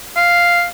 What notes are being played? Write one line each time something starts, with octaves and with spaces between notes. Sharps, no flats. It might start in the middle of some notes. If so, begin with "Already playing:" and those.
F5